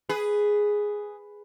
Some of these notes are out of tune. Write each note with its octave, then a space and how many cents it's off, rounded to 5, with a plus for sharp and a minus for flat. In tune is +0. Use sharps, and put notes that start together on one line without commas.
G#4 +0 B4 +5